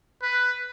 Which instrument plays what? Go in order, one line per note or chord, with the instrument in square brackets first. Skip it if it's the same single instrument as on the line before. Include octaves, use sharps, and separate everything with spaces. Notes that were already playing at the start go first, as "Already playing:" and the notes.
[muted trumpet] B4